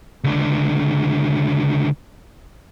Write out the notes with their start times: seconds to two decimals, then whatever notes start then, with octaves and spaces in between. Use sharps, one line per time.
0.24 C#2 D3